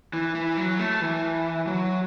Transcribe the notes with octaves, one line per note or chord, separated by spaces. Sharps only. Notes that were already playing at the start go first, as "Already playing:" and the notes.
E3
E3
F#3
A3
E3
F#3